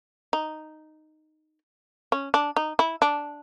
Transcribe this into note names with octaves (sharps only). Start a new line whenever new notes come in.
D#4
C#4
D4
D#4
E4
D4